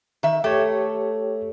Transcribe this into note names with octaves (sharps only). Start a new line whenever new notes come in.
D#3 E5
A3 G4 C#5